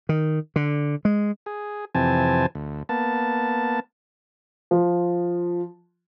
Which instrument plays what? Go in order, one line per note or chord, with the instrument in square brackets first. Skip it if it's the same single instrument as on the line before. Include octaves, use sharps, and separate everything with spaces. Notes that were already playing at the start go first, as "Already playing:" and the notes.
[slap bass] D#3
D3
G#3
[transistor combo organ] G#4
F2 C3 E3 C4 G#5 A5
D2
A#3 B3 A5
[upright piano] F3